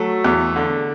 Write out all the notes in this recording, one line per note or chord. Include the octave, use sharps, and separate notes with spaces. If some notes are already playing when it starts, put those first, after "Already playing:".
Already playing: F#3 A3 A4
E2
D3